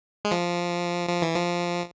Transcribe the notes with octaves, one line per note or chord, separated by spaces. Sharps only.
G#3
F3
F3
E3
F3